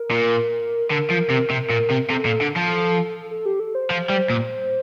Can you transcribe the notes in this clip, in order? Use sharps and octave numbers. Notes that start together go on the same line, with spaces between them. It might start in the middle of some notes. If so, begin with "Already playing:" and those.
Already playing: A#4
A#2
D3 A#4
F3
C3
C3
A#2
C3
C3 A4
A#2
D3
F3
A4
G4
A4
C5
F3
G3
A#2